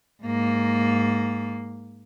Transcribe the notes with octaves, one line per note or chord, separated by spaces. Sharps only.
G#2 A#3